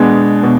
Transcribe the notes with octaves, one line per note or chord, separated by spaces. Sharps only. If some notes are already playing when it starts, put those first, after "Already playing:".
Already playing: B2 G#3 B3 D4
B2